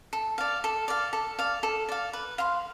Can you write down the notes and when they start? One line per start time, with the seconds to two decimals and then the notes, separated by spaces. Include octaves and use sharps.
0.13 A4
0.38 D5 F5
0.64 A4
0.88 D5 F5
1.13 A4
1.39 D5 F5
1.63 A4
1.89 D5 F5
2.13 B4
2.38 F5 C6